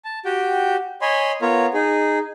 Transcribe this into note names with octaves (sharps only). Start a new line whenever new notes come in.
A5
F#4 G4 G5
C#5 D#5 G#5 B5 C6
B3 F4 A#4 C#5
D#4 G#4